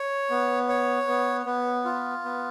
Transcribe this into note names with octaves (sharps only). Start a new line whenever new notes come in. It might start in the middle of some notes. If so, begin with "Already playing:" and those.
Already playing: C#5
B3
C#5
B3
B3
F4
B3